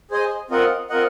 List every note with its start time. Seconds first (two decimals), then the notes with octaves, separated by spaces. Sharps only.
0.11 G#4 C5 D#5 G#5
0.50 C4 F4 A#4 D#5 F#5
0.90 C4 F4 A#4 D#5 F#5